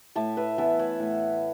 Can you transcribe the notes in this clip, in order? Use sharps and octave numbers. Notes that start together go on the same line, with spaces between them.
A2 E5 A5
B4 E5
E3 B3 E5 A5
C#5 F#5
A2